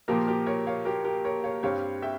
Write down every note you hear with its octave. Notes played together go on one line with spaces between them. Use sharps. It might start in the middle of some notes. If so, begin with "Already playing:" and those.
A#2 F3 A#3 G4 A#4
G4 A#4
A#4 C#5
C#5 F5
G4 A#4
G4 A#4
A#4 C#5
C#5 F5
G2 G3 C4 C#5 F5
E5 G5